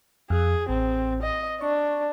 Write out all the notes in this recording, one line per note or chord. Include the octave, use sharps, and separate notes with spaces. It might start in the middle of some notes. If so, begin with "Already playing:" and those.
F2 G#4
A1 C4
D#5
D4 C#6